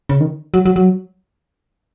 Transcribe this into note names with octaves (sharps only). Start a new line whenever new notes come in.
C#3
D#3
F#3
F#3
F#3